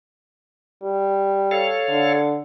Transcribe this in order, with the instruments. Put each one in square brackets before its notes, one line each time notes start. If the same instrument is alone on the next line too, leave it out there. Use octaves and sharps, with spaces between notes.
[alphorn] G3
[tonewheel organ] A4 C#5 F5
[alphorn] D3